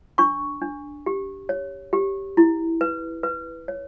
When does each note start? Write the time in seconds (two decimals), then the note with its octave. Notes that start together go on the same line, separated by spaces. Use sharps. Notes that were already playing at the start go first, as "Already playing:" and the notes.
0.18 D4 C#6
0.62 D4
1.06 G4
1.49 C#5
1.93 G4
2.37 E4
2.81 B4
3.23 B4
3.68 C#5